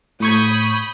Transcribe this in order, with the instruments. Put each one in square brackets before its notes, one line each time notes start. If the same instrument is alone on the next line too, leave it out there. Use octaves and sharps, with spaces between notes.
[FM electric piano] A2 C#6 G#6 [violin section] B5 D#6 G6